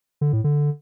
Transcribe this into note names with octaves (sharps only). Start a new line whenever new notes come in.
D3
A2
D3